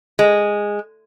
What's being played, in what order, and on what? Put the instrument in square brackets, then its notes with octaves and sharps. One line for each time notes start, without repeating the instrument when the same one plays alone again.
[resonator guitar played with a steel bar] G#3